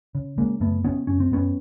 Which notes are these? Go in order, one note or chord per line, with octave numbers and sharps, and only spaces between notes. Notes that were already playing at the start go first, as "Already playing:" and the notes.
C#3
C#3 G#3 A#3
F#2 A3 B3
C#3 B3 C#4
F#2 C#4
C4
F#2 B3 C#4